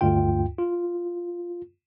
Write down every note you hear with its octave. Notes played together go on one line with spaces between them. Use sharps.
D2 G2 F4 G5
F4